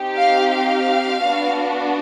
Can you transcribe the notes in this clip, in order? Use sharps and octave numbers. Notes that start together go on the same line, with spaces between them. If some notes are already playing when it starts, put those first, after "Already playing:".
Already playing: C4 D#4 G4
F5
F5
B3 D4 F#4